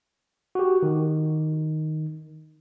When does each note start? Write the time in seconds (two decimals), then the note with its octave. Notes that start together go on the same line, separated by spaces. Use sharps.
0.55 F#4 G4
0.83 D#3